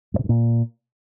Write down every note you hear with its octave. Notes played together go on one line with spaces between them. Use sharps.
G2
C3
G2
A#2